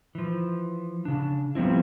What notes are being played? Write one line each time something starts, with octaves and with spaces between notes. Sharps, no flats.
E3 F3
C#3 D4
F3 G3 B3 C4 E4